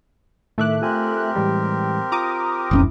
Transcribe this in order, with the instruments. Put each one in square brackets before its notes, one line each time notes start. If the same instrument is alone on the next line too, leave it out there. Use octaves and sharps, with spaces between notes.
[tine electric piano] A2 D#3 D6 [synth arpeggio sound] A3 E5 F#6
[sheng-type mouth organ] C4 G4 A#4 [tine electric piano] F4 A4 G#5
[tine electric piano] A2 E3 G#3 [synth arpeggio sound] G3
[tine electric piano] F4 [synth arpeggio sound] A#5 D6 D#6
[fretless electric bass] E1 F2 C#4 [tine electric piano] A#1 G#2 E4